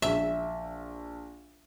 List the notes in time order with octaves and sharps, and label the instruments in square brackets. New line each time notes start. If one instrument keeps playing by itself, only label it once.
[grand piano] A#1 [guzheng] E5